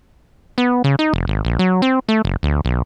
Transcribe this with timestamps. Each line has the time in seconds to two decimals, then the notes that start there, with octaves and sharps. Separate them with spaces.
0.58 B3
0.84 C#3
0.99 D#4
1.13 F1
1.28 G#1
1.45 A#1
1.59 F#3
1.82 C4
2.09 A3
2.25 F#1
2.43 D2
2.65 B1